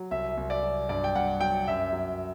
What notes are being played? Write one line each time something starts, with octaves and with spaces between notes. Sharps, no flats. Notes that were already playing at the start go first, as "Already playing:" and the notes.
Already playing: F#3
C2 E5
C2
D5
F#3
G2 D5
G5
G2 F#5
F#3 G5
F#2 E5
F#3